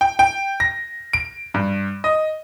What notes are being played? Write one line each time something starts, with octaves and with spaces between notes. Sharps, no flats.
G5
G5
A#6
D7
G2
D#5